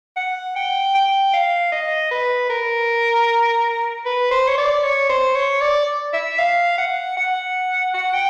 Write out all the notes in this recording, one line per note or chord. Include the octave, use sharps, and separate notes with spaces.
F#5
G5
G5
F5
D#5
B4
A#4
B4
C5
C#5
D5
C#5
C5
C#5
D5
E5
F5
F#5
F#5
F#5
G5